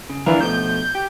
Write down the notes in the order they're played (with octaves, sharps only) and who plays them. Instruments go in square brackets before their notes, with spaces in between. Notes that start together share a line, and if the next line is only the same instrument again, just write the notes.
[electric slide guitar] C#3
[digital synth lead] E3 [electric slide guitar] D4 F4 A#4
[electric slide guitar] B2 F3 A3 [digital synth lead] G6
[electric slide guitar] G4